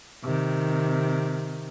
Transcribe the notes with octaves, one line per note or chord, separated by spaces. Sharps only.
C3 D#3